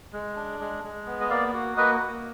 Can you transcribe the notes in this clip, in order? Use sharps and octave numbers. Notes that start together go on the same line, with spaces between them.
G#3
D4
G#3
G#3
B3
D#5
A#3 D5 F5
F#4
A#3 B4 D#5
A#3